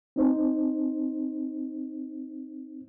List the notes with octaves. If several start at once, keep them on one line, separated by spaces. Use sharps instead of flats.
C4 D#4 C5